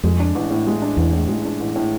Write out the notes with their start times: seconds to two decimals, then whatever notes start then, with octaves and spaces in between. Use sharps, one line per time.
0.03 F2 G#3
0.20 D4
0.35 A1
0.50 A2
0.67 G#3
0.82 D4
0.97 A1 E2
1.13 A2
1.28 G#3
1.45 D4
1.60 A1
1.76 A2